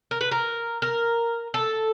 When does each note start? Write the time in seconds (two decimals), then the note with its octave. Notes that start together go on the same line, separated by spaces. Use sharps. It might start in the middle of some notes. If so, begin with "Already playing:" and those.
0.11 A#4
0.21 B4
0.31 A#4
0.82 A#4
1.54 A4